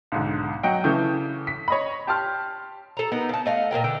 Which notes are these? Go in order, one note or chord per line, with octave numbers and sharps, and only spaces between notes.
B1 G#2 D3
F#3 D#5 F#5 G5 D7
C#3 E3 A3 G6
B6
C#5 D#5 B5
G4 A5 C6 F6
A4 A#5
B3 D#4 A#4
C#3 A5
A3 D#5 F5 F#5
A#2 C#3 A#4 G5
D3 E3 G5